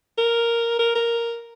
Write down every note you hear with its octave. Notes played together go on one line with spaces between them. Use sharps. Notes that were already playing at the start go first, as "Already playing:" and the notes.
A#4
A#4
A#4